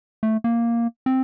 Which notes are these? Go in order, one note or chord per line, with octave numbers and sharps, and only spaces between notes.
A3
A#3
C4